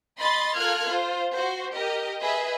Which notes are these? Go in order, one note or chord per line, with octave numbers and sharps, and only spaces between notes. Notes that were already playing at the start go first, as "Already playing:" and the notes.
D#5 B5 C6 A6
F4 A4 A#4 F6 F#6 G#6
F4 C5
F#4 C5
G4 A#4 D#5
G#4 B4 D#5 E5